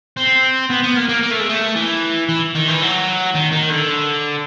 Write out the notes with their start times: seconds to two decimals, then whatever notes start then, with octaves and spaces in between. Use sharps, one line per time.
0.17 C4
0.70 B3
0.83 B3
0.97 A#3
1.09 A#3
1.23 A#3
1.31 A3
1.41 G#3
1.49 A3
1.75 E3
2.29 E3
2.55 D#3
2.68 E3
2.82 F#3
3.35 D#3
3.52 D#3
3.70 D3